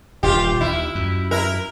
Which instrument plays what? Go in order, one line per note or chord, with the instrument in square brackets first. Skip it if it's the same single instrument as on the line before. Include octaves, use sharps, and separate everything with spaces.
[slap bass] D#1 [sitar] F4 G4
[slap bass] D#2 [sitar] E4
[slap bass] F#2
[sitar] E4 A#4